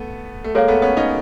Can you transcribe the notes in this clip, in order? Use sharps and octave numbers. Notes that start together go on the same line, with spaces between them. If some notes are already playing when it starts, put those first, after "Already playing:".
Already playing: A3 B3
A3
G#3 A#3 A4 C#5 F5
A3 B3
B3 C#4
C#4 D#4